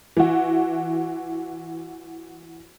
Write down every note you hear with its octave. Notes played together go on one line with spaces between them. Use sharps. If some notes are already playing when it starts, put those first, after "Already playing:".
E3 F#4